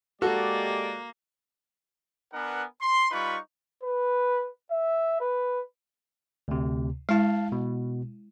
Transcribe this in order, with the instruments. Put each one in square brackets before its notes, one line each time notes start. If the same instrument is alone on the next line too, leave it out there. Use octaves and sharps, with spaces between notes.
[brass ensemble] G#3 G4 D5 [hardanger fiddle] A#3 [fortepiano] F#4 [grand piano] A4
[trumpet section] B3 D4 A#4 B4 F#5 G#5
C6
G3 D#4 F4 B4 B5 C#6
[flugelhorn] B4
E5
B4
[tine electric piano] D2 C3
[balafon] G#3 E4 [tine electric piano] F5 A5
[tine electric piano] B2